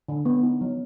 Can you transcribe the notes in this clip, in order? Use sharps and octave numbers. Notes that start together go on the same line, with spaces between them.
D3
B3
D#4
F#3